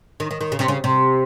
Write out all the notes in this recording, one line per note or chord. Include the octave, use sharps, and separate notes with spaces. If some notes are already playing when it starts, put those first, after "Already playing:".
D#3
D#3
D#3
C#3
C3
C#3
C3